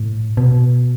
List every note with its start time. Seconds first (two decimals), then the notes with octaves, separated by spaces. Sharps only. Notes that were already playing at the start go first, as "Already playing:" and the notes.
Already playing: A2
0.37 B2